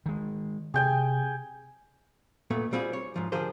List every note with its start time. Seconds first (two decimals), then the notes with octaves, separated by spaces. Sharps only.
0.06 D#3 G#3
0.74 C3 G#4 G5 G#5
2.51 A#2 A3 B3
2.72 B2 G3 C4 F4 G#4
2.93 C#5
3.16 G#2 F3
3.32 D3 F3 G4 G#4 A#4 C5